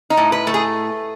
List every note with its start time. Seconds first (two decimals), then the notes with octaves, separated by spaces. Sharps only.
0.10 D#4
0.17 A2
0.32 B4
0.47 A3
0.54 G#4